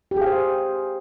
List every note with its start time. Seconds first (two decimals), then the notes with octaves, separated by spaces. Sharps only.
0.11 G4
0.16 G#4
0.21 F5
0.27 C5